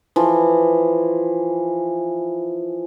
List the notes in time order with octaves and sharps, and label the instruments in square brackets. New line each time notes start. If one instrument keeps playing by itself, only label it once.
[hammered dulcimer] E3 F3